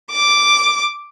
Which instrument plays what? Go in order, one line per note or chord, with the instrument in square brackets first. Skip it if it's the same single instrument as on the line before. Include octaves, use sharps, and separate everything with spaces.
[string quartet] D6